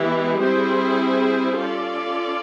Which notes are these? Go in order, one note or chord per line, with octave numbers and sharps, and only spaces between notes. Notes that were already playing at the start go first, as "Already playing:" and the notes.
Already playing: E3 G#3 B3 E4 G4
G3 C4 E4 G#4 C5
C#4 F4 A4 D5